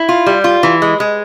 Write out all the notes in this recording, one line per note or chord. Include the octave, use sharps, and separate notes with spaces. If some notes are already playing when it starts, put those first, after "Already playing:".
Already playing: E4
F4
G3
F4
E3
G#3
G#3